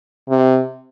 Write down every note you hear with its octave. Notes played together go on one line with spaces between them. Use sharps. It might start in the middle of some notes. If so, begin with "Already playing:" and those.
C3